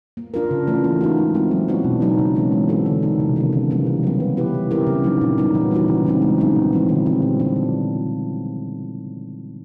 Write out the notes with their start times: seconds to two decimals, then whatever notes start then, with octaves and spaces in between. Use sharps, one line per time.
0.17 A#3
0.34 D4 F4 A#4
0.51 C#3
0.67 E3 A3 C#4 F4
0.84 A#3
1.01 D#4 F#4
1.17 G#3
1.35 C4 E4
1.51 F#3
1.68 B3 D4 F#4
1.84 B2
2.01 F#3 A#3 D#4 F#4
2.19 C#3
2.35 E3 G#3 C4
2.52 F#3
2.68 A#3 D4 F#4 A4
2.86 D3
3.02 F#3 A#3 D#4
3.19 C3
3.36 D#3 F#3 B3
3.53 C#3
3.70 E3 G3 A#3
3.86 C#3
4.03 F#3 B3
4.20 B3
4.37 E4 G4 B4
4.54 G3
4.71 C4 E4 G4 A#4
4.87 C#3
5.04 F#3 A#3 D#4
5.21 A#2
5.38 G3 B3 D#4
5.55 E3
5.71 G3 A#3 D#4 F#4
5.88 C#3
6.05 E3 G#3 C4 D#4
6.22 C#3
6.38 F#3 B3 D#4
6.56 A#2
6.73 F3 G#3 C4 E4
6.89 D3
7.06 G3 C4
7.22 A#2
7.40 G3 A#3 D4
7.56 A#3